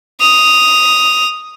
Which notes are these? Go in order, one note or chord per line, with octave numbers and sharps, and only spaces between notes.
D#6 F7